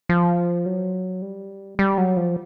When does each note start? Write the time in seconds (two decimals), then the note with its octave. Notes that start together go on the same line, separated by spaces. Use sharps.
0.09 F3
0.66 F#3
1.22 G3
1.79 G3
1.98 F#3
2.17 F3